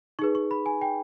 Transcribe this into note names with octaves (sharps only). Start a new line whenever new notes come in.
D#4 G#4 B4 C#6
C#6
B5
G#5
G5